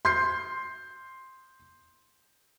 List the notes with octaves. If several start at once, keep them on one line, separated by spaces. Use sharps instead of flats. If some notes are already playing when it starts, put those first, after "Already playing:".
C6 G6 C7